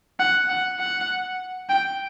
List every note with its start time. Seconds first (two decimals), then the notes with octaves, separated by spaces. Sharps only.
0.19 F#5
0.50 F#5
0.79 F#5
1.70 G5